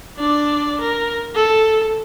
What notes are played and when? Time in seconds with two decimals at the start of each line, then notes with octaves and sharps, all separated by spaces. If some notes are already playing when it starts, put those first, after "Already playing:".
0.17 D4 D5
0.81 A#4
1.35 A4